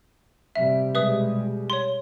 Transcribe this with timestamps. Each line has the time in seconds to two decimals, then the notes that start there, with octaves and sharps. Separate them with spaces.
0.56 C3 G3 E5
0.95 B2 G3 G#3 B4 E5 D#6
1.70 C#5 C6